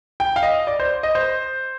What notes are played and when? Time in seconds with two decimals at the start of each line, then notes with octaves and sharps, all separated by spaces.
0.20 G5
0.36 F5
0.43 D#5
0.67 D5
0.80 C5
1.03 D#5
1.15 C5